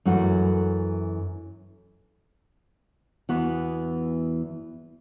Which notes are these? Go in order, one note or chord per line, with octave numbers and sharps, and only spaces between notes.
F#2 E3 A3 F#4
E2 E3 B3 F#4